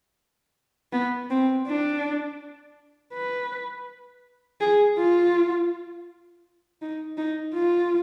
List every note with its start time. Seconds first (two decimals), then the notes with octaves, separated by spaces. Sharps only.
0.93 B3
1.31 C4
1.67 D4
3.14 B4
4.61 G#4
4.98 F4
6.82 D#4
7.18 D#4
7.54 F4